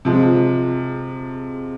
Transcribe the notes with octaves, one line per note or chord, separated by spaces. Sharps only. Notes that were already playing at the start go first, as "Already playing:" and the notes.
C3 F3 G#3